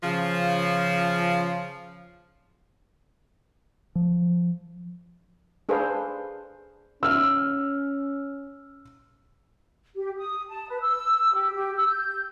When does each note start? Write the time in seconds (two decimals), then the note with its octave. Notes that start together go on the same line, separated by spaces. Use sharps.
0.03 C#3 F3
3.95 F3
5.69 D4 G#4 A4 B4 C5 F5
7.03 C#4 E6 F6
9.96 G4
10.17 D#6
10.49 A5
10.69 B4
10.81 E6
11.34 G4
11.55 G4
11.76 E6
11.89 G6